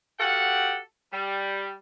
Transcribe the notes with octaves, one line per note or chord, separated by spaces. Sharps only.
F#4 G4 A4 F5 F#5
G3